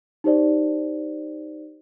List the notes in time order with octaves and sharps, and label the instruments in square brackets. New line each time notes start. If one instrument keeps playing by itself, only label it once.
[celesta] D#4 G4 C5 D5